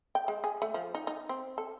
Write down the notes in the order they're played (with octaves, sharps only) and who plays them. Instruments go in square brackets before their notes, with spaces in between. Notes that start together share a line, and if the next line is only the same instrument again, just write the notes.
[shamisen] G5
G#3
G#4
A3
F3
D#4
D#4
C4
A4